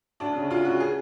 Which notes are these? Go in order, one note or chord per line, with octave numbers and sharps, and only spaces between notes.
D2 D4
C#3
D2 F4
C#3 F#4
G#4